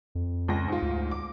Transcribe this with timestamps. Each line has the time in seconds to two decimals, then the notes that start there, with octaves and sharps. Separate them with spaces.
0.15 F2
0.48 C#2 A#6
0.68 G#2 F4
0.82 D2
1.11 D6